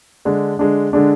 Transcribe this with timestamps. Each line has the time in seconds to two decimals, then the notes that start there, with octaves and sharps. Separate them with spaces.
0.25 D3 G#3 D4
0.59 D3 G#3 D4
0.93 D3 G#3 D4